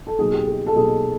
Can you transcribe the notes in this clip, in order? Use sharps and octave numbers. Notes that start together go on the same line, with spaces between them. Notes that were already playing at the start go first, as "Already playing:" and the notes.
A4
B2 F#3 A#3 D#4 G#4
G4
G#4
A4
B2 F#3 A#3 D#4 G#4